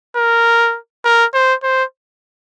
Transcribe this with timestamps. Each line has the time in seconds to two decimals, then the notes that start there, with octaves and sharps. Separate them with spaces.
0.16 A#4
1.05 A#4
1.34 C5
1.63 C5